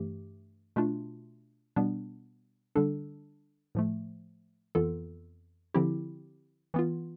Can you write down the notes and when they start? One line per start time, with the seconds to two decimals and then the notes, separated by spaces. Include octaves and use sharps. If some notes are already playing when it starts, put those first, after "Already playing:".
Already playing: G2 E3 A3 G4
0.76 B2 A3 D4 F4
1.76 B2 G3 B3 D4
2.75 D3 G3 D4 A4
3.75 A2 F3 A3
4.75 F2 E3 B3 F4 A4
5.74 D3 F3 C4 E4 G4
6.74 E3 B3 F4